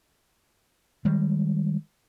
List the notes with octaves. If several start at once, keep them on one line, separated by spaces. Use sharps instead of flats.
D#3 G3 G#3